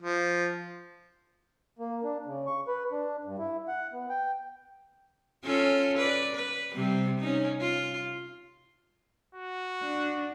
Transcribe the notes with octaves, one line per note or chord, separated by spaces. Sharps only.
F3
A#3
D4
C#3
C#6
B4
D4
G2
E4
F#5
B3
G5
C#4 F4 A4
B4 D5
B4
C3 G3 C4
C#4 D#4
F4
F#4
D4